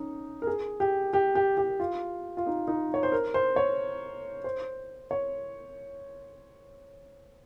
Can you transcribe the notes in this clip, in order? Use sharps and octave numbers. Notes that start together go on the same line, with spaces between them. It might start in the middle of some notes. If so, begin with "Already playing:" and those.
Already playing: C#4 D#4
A#4
G#4
G4
G4
G4
G4
F4
F4
D#4
D#4
C#5
C5
A#4
C5
C#5
C5
C#5